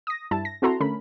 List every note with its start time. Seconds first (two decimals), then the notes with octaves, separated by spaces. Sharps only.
0.07 D#6 A#6
0.31 G2 E4 A5
0.45 A#6
0.62 C4 E4 F#4 A4 A#5 C6
0.80 D3 A3 C#4 A#4 B5